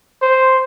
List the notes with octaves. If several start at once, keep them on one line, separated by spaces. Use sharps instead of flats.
C5